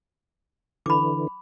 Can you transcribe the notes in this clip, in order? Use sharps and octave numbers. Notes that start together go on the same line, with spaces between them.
D3 E3 B5 D6